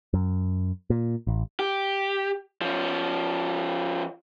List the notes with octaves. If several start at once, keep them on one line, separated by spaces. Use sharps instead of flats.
F#2
A#2
A1
G4
F3 C#4